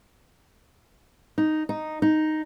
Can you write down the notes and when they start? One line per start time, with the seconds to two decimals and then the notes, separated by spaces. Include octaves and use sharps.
1.38 D#4
1.69 D#4
2.02 D#4